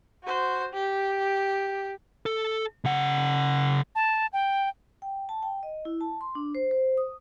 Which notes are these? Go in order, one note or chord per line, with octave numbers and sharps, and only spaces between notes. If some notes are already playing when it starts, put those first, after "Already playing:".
F#4 C5
G4
A4
C#3 F#5
A5
G5
G5
A5
G5
D#5
E4
A5
C6
D4
C5
C5
D#6